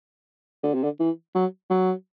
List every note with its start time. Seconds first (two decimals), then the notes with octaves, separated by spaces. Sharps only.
0.63 D3
0.74 C3
0.84 D3
1.00 E3
1.35 F#3
1.70 F#3